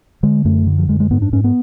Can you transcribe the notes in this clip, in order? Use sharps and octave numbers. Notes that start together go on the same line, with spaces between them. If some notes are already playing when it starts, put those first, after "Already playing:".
D3 G#3
F#2 A3
D3
F3
F#2 G#3
G#3
G#2 B3
D4
G#2 C#4
B3